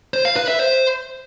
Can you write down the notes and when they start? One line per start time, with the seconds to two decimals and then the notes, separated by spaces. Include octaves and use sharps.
0.14 C5
0.25 F5
0.36 B4
0.48 E5
0.59 C5